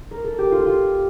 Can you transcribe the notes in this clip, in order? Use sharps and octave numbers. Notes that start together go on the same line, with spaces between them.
A#4
A4
G4
F4
F4